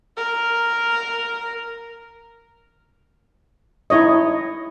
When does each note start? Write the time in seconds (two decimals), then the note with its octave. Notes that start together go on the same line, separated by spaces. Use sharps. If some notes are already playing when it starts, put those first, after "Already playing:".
0.17 A#4
3.90 D#4 E4 C#5 D#5